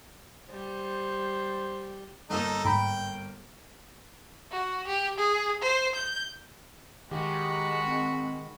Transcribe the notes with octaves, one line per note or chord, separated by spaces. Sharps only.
G3 C5
G1 A#3 D#4 A4
G#2 G5 A#5 B5
F#4
G4
G#4
C5
G6
D#3 G#3 F#4 G4 B5
C4